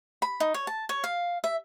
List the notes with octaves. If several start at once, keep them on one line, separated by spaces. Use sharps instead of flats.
B5
D#4
C#5
A5
C#5
F5
E5